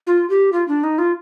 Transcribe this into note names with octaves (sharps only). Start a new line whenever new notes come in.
F4
G4
F4
D4
D#4
F4